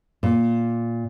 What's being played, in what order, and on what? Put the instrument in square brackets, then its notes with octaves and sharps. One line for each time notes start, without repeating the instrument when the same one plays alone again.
[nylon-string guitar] A#2